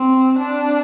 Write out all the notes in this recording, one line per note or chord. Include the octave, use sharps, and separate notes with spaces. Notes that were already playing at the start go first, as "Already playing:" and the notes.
Already playing: C4
D4